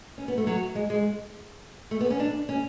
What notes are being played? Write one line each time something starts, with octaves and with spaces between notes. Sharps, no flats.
C#4
B3
A3
F#3
G#3
G#3
A3
B3
C#4
D4
C#4